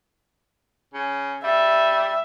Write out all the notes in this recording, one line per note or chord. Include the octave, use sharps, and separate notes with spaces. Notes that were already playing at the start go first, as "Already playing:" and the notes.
C#3
G3 E5